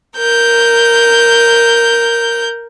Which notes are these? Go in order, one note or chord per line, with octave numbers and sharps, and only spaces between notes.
A#4 G6